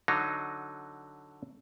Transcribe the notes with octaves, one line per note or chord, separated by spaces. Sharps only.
D3 F#3 D#4 A#5